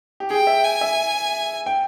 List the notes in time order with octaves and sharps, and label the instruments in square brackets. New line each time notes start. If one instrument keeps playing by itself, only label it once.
[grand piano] G4
[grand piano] G#4 [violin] G5
[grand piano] E5
[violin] G#5
[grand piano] E5
G5